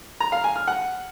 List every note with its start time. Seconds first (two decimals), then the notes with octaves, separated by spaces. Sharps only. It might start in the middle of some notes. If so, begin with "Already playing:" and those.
0.20 A#5
0.32 F5
0.44 G#5
0.56 F6
0.67 F#5